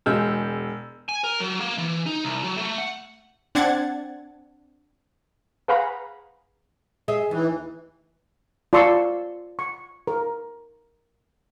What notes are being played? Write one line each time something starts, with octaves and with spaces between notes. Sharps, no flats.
E1 G#3 E6 G6
G#5
A#4
F#3
A#3
E3
D#4
C2
F#3
A3
F#5
C4 D4 F#5 G#6 A6
G#4 B4 F5 F#5 A#5 B5
G#4 D#5 E5
D#2 E3
F4 D5 A5 C6 C#6 E6
C#6
A#4